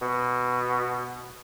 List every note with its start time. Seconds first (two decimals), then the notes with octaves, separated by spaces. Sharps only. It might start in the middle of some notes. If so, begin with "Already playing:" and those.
0.02 B2